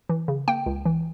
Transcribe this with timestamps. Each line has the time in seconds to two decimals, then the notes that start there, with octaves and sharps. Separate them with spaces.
0.09 E3
0.28 C#3
0.48 A#3 G5
0.66 C#2
0.86 E3